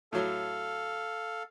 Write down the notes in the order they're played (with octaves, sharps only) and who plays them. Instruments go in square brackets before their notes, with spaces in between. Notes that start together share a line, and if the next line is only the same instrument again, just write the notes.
[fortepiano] A2 F#3 [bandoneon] A4 F5